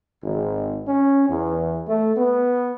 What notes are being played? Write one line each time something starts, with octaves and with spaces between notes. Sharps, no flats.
G#1
C#4
E2
A3
B3